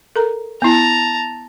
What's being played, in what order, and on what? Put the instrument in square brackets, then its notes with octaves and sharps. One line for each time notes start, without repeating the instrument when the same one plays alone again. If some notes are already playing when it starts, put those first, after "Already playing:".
[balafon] A4 A#4 A#5
[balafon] B3 E4 [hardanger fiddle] A5 A#5